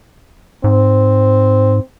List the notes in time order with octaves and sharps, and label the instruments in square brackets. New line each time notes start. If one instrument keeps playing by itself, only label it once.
[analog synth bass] G#2 [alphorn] C4